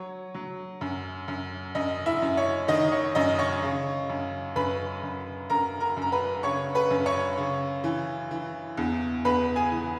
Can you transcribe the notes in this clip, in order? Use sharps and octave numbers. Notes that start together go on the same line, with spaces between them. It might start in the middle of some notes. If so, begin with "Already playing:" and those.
Already playing: F#3 C#5
F#3
F#2
F#2
F#2 D#5
E4 E5
F#2
C#5
D#3 D#5
C#5
F#2 D#5
C#5 C#6
C#3
F#2
F#2 B4 B5
F#2
F#2 A#4 A#5
A#4 A#5
F#2
A#5
B4 B5
C#3 C#5 C#6
B4 B5
F#2
C#5 C#6
C#3
E3
E3
E2
E2 B4 B5
G#4 G#5
E3